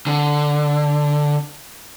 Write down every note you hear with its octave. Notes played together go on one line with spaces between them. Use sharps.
D3